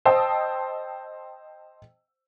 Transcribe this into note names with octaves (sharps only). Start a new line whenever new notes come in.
C5 D#5 G5 A5 D#6 E6